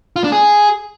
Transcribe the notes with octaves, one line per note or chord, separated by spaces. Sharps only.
F4
D4
G#4